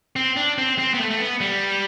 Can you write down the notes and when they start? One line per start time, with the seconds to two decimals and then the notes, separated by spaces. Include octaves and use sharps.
0.16 C4
0.37 D4
0.58 C4
0.78 C4
0.94 B3
1.00 A3
1.11 A3
1.20 B3
1.41 G3